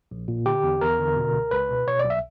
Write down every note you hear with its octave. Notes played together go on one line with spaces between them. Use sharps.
A#1
A#2
D3 G4
E2
E2 A#4
D3
B2
C#2
C#2 B4
B2
B2 C#5
D5
B1
E5